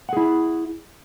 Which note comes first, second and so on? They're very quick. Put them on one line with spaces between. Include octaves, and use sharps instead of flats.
F#5 G#4 E4